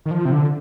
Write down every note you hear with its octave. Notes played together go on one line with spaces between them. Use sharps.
D#3
F3
C3
D3